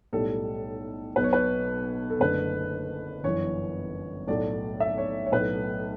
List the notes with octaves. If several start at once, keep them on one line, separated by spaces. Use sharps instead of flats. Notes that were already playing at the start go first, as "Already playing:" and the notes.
B1 A2 G3 A4
B1 B2 F#3 B4
C#5
B4
A4
F#1 F#2 D3 A3 B4
G1 F#2 E3 C#5
B1 A2 F#3 A3 D5
E5
C#5
C#5
B1 A2 F#3 A3 B4